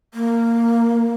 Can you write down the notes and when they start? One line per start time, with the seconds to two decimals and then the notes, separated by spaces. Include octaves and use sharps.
0.14 A#3